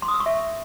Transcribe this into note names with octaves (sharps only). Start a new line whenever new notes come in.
C6
D#6
E6
C#6
E5